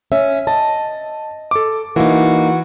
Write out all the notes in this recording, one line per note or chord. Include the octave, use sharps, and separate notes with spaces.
C#4 E5
D#5 A5
A4 D6
E3 A#3 D#4 F#4